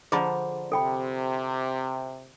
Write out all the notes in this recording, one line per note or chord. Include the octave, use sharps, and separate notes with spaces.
D3 F3 G#4 A#5 B5
C3 A4 G5 B5